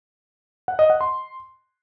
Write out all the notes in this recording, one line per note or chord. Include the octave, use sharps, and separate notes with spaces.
F#5
D#5
F#5
C6